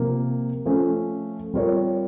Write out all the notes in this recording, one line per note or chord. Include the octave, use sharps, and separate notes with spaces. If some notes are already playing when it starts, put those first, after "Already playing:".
Already playing: C3 F3 A#3
F3 A3 C#4
G3 C4 F4 A#4 C#5